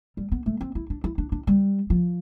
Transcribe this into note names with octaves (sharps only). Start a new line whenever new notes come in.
G3
B3
A3
C4
E4
D4
E4
D4
D4
G3
F3